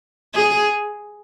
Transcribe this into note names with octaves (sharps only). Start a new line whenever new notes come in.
G#4